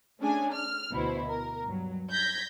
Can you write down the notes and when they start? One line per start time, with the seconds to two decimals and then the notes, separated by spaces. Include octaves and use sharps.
0.19 A3 C#4 D4 G#4 G#5
0.53 F6
0.92 D2 B2 E4 C5
1.28 A#4
1.66 G2 F#3
2.11 G6 G#6 A#6 B6